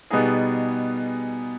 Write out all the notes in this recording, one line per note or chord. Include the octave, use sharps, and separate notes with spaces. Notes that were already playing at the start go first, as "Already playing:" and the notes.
B2 G3 B3 D#4 G#4